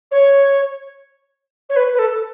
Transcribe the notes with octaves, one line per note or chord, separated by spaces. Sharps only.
C#5
C#5
B4
B4
A4